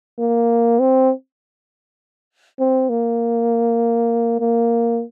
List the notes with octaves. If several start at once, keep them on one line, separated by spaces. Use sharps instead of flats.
A#3
C4
C4
A#3
A#3